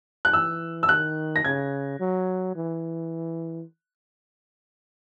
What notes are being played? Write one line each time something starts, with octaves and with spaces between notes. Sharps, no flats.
F#6
E3 E6
E6
D#3 F#6
A#6
C#3 G#6
F#3
E3